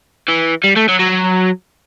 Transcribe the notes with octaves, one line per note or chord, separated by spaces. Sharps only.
E3
G3
A3
F#3
F#3